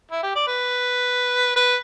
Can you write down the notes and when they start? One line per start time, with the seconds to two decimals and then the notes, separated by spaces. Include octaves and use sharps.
0.12 E4
0.23 G4
0.36 D5
0.48 B4
1.56 B4